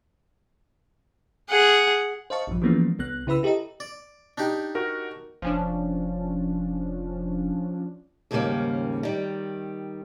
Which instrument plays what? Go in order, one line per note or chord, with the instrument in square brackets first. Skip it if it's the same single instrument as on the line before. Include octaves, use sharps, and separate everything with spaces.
[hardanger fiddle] G#4 F#5
[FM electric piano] C5 D#5 F5 A5 C#6
A#1 G2 F3
E3 F3 G#3 A#3 B3 C#4
C2 B3 F#6
C#3 E4 B4 B5 E6
E4 G4 A4 D#5 A#5
[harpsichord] D5
D4 D#4 G4
[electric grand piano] F#4 A#4
[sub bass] F1 [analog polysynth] F3 C#4 D4
[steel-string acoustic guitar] D#2 G#2 C#3 G3 A#3 C#4
D#3 G3